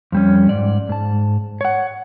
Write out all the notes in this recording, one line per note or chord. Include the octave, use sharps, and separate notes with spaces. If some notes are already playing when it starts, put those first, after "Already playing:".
F2 G3 C#4
G#2 D5
G#2 A5
C#5 F#5